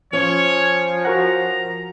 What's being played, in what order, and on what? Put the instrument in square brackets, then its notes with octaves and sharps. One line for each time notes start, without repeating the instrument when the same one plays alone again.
[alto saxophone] F3 [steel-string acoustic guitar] C#4 [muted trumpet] C#5
[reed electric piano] F#4 A#4 F#5 [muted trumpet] A#5